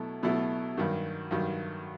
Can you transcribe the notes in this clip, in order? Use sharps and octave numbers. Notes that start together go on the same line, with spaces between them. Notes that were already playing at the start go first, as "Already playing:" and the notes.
Already playing: B2 F#3 A3 E4
B2 F#3 A3 E4
G2 D#3 F#3
G2 D#3 F#3